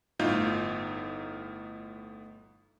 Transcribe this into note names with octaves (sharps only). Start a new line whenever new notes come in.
G1 A2 D#4 F4 G6